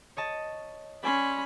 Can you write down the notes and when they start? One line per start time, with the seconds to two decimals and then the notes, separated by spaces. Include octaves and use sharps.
0.17 C#5 D#5 A5
1.03 C#4 D5 G#5 B5 C6